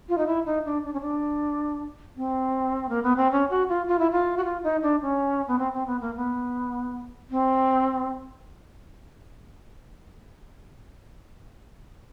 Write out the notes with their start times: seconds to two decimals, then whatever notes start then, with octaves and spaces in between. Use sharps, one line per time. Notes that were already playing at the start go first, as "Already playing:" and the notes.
0.09 F4
0.18 D#4
0.27 E4
0.46 D#4
0.65 D4
0.85 D4
0.94 C#4
1.01 D4
2.17 C4
2.89 A#3
3.03 B3
3.17 C4
3.32 C#4
3.50 F#4
3.69 F4
3.88 F4
3.99 E4
4.12 F4
4.37 F#4
4.44 F4
4.63 D#4
4.83 D4
5.02 C#4
5.48 B3
5.59 C4
5.74 C4
5.87 B3
6.01 A#3
6.16 B3
7.30 C4